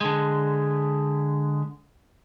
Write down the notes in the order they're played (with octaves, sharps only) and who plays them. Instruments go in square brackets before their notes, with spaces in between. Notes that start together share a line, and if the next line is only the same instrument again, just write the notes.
[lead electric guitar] D3 G#3